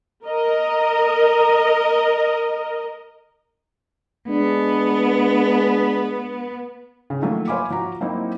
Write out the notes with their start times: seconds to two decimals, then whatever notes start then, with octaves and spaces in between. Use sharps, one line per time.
0.24 A#4 D#5
4.29 G#3 B3 D4
7.10 C#3
7.22 D#3 F3 F#3 A3 A#3
7.48 C5 C#5 F5 G#5 B5 D6
7.70 F3 F#4 A#5
8.01 F#3 A#3 C4 D#4 E4